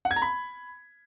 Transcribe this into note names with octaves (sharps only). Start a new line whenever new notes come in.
F#5
G#6
A#5
B5